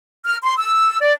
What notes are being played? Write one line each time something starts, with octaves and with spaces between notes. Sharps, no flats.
F6
C6
E6
D5